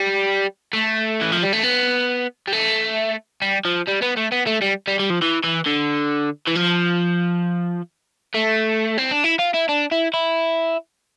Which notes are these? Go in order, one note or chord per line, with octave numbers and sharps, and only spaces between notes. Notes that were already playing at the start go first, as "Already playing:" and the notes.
Already playing: G3
A3
E3
F3
G3
A3
B3
G3
A3
G3
F3
G3
B3
A3
B3
A3
G3
G3
G3
F3
E3
E3
D3
E3
F3
A3
C4
D4
E4
F4
E4
D4
E4
E4